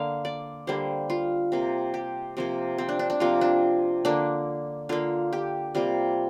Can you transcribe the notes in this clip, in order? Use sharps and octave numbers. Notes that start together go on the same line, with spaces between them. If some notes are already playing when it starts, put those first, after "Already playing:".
Already playing: D3 A#3 F5
D5
D3 G3 A#3 C5
F4
C3 A#3
G4
C3 F3 A#3
C4
D4
D4
D4
C3 F3 A#3 F4
D4
D3 A#3 D4
D3 A#3 F4
G4
C3 G3 A#3 F4